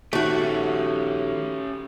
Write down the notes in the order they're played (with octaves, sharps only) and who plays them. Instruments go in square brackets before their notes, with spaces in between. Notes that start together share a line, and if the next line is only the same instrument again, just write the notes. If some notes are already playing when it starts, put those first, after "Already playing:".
[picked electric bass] A#1 D#3 [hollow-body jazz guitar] A3 F#4 [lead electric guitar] C#4 G4